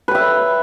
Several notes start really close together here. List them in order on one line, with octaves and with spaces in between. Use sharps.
B4 G5 E5